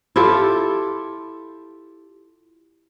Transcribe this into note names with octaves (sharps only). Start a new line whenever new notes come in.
E4 F4 G4 A4